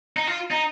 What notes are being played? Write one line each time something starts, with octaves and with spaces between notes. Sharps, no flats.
D#4
F4
D#4